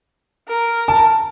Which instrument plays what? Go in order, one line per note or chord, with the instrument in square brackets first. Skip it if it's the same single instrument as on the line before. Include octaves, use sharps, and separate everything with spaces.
[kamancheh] A#4
[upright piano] A5